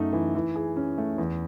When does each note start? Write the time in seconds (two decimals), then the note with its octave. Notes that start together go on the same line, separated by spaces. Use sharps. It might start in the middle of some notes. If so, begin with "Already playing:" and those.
Already playing: F#2 A3 D#4
0.13 E3
0.35 E3
0.56 G#4
0.77 C#4
0.98 A3
1.18 E2